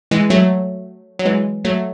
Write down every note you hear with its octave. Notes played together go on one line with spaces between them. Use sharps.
E3 G#3
F#3 A3
F#3
E3 G#3
F#3 A3